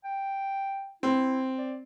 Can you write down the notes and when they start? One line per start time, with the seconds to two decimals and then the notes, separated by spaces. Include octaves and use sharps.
0.04 G5
1.03 C4 E4
1.58 D5